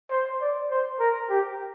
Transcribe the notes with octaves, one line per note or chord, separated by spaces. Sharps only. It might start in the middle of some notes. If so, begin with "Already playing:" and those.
C5
D5
C5
A#4
G4